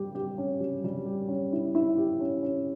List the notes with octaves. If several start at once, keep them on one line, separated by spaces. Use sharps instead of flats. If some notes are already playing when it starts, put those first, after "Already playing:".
Already playing: G3 G4
G4
C#4
G3
G3
G4
C#4
E4
E4
G4
C#4
C#4